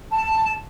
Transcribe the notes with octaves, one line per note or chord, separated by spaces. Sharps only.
A5